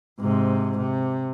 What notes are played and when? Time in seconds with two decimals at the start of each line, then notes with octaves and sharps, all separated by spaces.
0.21 G#2 C3
0.77 C3